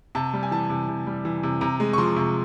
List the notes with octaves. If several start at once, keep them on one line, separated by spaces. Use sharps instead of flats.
C3 A5
G3
G#5
E3 A5
C3
C3
G3
E3
C3
C3 A#5
G#3
C#6
F3 C6
C3